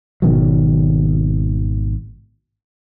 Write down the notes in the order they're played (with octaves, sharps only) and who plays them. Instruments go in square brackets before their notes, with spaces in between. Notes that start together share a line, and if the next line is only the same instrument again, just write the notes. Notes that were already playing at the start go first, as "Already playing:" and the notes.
[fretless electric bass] G#1 B2 D#3 F#3